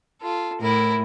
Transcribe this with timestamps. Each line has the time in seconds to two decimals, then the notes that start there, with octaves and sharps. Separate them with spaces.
0.21 F4 A4
0.60 A2 E4 A#4